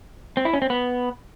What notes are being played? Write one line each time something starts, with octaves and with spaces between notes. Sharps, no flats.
C4
E4
C#4
C4
B3